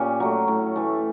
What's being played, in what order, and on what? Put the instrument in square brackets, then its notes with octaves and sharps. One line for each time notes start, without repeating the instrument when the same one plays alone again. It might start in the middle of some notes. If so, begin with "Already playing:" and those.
Already playing: [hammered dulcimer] A#2 C#4 G4
F#3 A3
A2
E3 A3